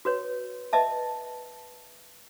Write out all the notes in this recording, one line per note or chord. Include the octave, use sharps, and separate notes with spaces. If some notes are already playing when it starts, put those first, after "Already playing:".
F#4 B4 C#5
B4 D#5 E5 A5